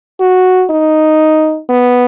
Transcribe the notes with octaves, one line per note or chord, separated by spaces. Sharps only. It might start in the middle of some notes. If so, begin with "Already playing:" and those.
F#4
D#4
B3